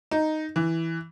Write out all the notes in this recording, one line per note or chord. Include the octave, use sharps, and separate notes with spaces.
D#4
E3